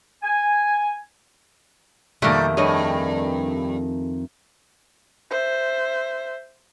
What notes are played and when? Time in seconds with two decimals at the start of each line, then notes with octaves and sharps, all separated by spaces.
0.23 G#5
2.22 F2 B2 D#3 G3 A3 A#3
2.57 G2 G#4 C#5 D#5
5.30 C5 E5